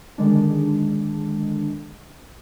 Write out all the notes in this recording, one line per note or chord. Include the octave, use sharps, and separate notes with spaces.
D3 D#3 G#3 D4